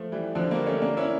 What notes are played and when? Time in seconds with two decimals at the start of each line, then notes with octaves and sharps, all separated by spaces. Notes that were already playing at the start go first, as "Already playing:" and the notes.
Already playing: F3 A3
0.12 E3 G3
0.35 D3 F3
0.51 G3 A#3
0.67 A3 C#4
0.82 A#3 D4
0.97 C#4 E4